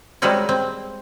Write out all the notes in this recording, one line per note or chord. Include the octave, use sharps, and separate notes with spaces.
G3 G#3 C4 F#4 A#4 C#5
C4